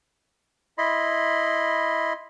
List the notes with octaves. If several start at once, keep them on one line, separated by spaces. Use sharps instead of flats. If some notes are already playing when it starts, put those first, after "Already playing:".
E4 D#5 B5 C6